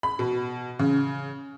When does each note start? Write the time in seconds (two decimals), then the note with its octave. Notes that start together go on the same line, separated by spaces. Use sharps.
0.03 B5
0.19 B2
0.79 C#3